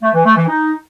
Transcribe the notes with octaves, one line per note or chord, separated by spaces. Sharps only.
A3
E3
A3
E3
D#4